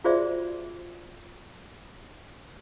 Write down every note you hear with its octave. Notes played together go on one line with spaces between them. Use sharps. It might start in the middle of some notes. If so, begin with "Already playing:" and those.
F4 F#4 G#4 C5 D5 E5